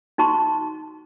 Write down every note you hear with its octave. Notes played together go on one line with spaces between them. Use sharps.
D#4 F#4 A5 C#6